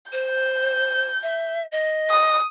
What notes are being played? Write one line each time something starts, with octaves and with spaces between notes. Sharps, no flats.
C5 G6
E5
D#5
D#6